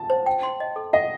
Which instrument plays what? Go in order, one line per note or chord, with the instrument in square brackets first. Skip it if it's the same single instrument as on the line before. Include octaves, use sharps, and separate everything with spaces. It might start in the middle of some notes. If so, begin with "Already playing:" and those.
Already playing: [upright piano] A5
[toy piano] C5
G5
C6
D#5
A4
[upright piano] D#5 [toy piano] F#5